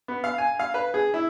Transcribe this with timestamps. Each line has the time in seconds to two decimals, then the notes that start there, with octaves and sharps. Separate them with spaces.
0.08 B3
0.24 F5
0.38 G#5
0.59 F5
0.74 B4
0.94 G#4
1.14 E4